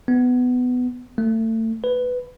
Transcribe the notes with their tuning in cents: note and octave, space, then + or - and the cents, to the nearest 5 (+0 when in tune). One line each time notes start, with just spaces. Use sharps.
B3 +15
A3 +30
B4 +10